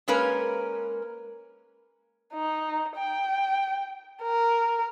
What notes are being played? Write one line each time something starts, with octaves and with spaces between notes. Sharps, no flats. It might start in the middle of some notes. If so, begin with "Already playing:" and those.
G#3 A#3 C#4 A#4 B4
D#4
G5
A#4